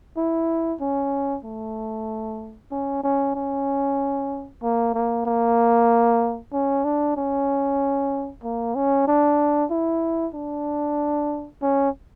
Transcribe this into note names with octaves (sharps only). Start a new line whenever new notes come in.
E4
C#4
A3
C#4
C#4
C#4
A#3
A#3
A#3
C#4
D4
C#4
A#3
C#4
D4
E4
D4
C#4